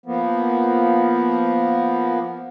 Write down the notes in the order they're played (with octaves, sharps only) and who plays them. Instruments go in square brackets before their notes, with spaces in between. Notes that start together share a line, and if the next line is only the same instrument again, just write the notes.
[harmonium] F3 A#3 B3